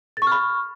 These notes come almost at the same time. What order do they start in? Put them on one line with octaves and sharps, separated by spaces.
A6 C#6 F6 B5